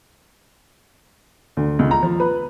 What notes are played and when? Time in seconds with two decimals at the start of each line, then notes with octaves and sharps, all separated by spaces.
1.57 D2
1.79 C#2
1.91 A#5
2.03 F3
2.20 B4